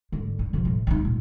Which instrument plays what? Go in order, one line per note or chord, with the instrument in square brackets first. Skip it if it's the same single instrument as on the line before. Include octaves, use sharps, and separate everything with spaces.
[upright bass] G#2 D3
G2
E1 F3
A2
C4 D#4
A#2